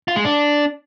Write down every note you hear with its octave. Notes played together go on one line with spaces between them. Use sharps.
F4
G#3
D4